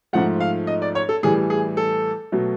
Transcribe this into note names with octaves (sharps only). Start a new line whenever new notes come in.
G#2 F3 A3 F#5
F5
D#5
D5
C#5
A4
A2 E3 G3 G#4
G#4
A4
B2 F#3 A3